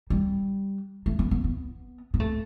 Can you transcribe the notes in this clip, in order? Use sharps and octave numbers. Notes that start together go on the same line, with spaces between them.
G3
A3
B3
B3
B3
B3
A3